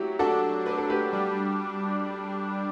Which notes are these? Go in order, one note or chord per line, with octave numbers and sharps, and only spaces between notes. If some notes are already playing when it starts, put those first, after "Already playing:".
Already playing: F#3 E4 G4
D4 F#4 A4
D4 B4
A4
G4 B4
G3